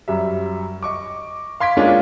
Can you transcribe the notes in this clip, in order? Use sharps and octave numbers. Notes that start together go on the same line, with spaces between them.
F#2 G3 E5
D#5 C#6 D6
F5 C6 G#6 B6 D7
G#3 A#3 C#4 D4 F4